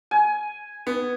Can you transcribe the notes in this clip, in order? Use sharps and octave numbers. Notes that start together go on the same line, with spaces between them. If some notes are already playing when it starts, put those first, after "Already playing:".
G#5
B3